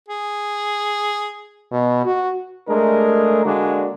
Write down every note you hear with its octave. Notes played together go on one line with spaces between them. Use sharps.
G#4
B2
F#4
G#3 A3 D4 G#4 A#4
D3 G#3 A#3 D4 F#4